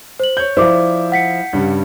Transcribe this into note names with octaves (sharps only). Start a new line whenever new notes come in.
C5 F#7
C#5 G6
F3 E4 C5 D5 D6
F#5 B6 C#7
G2 C#3 G3